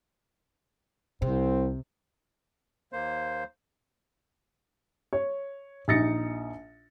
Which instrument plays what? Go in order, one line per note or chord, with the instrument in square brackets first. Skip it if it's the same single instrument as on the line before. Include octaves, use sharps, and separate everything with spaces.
[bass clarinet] C2 [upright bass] C3 [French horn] C4
[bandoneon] D#2 A#3 C5
[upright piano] C#5
A#1 D#4 A6 A#6 C#7